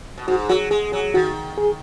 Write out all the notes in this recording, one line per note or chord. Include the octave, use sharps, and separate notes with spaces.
B2
G#2 F#4
F#3 F#4
G#3 G#4
F#3 G#4
D#3 F#4
G#4